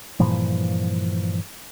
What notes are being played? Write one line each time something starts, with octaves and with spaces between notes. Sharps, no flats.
G2 A#2 E3 F3